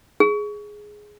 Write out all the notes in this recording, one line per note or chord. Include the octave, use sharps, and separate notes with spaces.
G#4